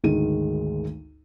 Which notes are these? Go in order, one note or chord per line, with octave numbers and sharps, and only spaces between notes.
G#1 D2 D#3 G#3 D#7